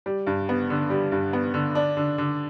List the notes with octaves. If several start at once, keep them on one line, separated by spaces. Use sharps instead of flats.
G3
G2
B3
D3
G3
G2
B3
D3
D4
D3
D3